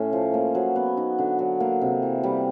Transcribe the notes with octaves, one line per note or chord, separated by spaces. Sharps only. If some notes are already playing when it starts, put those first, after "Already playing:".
Already playing: A2 A3 C#4
F3
A#3
F#3
B3
D#4
D3
F#3
A#3
C3
E3
G3